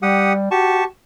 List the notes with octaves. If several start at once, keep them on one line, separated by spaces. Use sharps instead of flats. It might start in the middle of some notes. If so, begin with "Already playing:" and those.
G3 G4 F#5 D#6
F#4 G4 A5 C#6